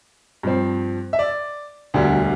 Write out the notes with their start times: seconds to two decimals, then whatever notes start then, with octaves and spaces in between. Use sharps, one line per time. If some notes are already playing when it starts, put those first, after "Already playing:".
0.43 G2 F3 C4
1.13 E5
1.19 D5
1.94 E1 D2 D3 G3